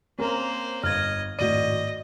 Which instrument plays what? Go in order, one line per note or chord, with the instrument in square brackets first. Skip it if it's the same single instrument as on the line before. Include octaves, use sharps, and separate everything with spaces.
[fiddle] A#3 C5 [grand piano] C4 C#4 A#4
[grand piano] G1 [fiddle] D#5 [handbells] F6 G#6
[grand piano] G#1 A2 D#7 [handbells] F#4 D5 [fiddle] D#5